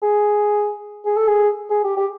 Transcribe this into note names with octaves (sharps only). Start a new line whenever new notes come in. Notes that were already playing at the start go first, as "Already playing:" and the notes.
G#4
G#4
A4
G#4
G#4
G4
G4